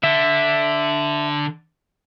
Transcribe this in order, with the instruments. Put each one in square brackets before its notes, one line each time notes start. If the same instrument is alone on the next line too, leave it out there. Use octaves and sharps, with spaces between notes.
[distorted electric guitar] D3 [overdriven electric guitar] E5